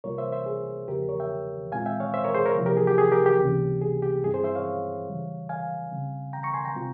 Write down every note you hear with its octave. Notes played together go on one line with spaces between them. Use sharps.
C2 C3 G3 A#3 F4 A#4 C#5
C5 E5
C5 E5
G#4
E2 C#3 F3 A#3 G4 A#4
A#4 C#5
E5 G5
A#2 G#3 C4 F4 F5 G#5
E5 G5
C#5 F5
C5 E5
A#4 C#5
G#4 C5
A#4 C#5
C3 F3 A#3 E4
G4 A#4
G#4
G4
G#4
G4 A#4
G4
C#2 C3 E3 A#3 C#4
G#4
G4
G2 G3 C4 E4 G#4
G#4 C5
C5 E5
C#5 F5
C#3 E3 G3
F5 G#5
C#3 G3 C4
G5 A#5
A#5 C#6
G#5 C6
G5 A#5
C3 G3 C4 F4